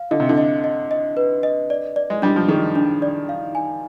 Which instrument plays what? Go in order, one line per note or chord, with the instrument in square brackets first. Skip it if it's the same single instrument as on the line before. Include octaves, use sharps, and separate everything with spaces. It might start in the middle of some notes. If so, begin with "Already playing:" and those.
Already playing: [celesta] F5
[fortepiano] D3 [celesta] D#5
[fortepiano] C3
D3
[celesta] D#5
D#5
D#5
B4
D#5
D5
D5
[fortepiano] G#3
[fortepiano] G3 [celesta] D4
[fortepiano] F3
[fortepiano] D#3 [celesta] G#4
[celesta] D4
D5
F5
G#5